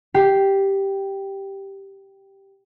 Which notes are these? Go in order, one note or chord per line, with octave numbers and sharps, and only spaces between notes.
G4 C7